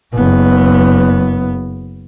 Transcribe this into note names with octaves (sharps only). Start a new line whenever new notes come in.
F#1 B3